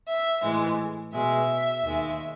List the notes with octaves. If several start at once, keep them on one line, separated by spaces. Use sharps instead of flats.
E5
A2 E3 G#3
B2 G#3 E5
D#2 D#3 G#3